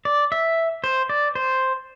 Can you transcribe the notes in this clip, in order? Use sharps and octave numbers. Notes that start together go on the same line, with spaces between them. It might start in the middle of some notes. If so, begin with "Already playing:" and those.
D5
E5
C5
D5
C5